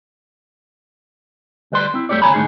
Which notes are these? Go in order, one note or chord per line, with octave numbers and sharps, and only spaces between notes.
D2 G3 B4 D5 C6
C4 E4
F#2 A3 D#4 G4 C#5 D5
D2 C#3 C#5 G#5 A#5 B5
G#2 D3 A3 C#4 D#4 G#4